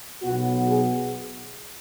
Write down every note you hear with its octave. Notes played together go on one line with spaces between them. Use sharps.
B1 B2 F#3 B3 F#4
G#4